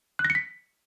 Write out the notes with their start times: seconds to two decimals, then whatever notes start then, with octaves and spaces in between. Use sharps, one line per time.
0.19 F#6
0.25 A#6
0.30 C#7
0.35 B6